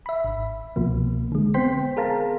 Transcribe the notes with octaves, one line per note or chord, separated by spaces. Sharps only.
E5 B5
G#1
C2 B2 F3 A#3
D3 G#3
B3 C4 C5 G5 C6 B6
G#4 A#4 F5 A5 A#5